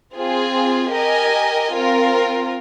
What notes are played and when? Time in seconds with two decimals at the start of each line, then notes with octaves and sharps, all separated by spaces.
0.14 C4 F4 G#4
0.92 G4 A#4 D#5 G#5
1.72 C4 F4 A#4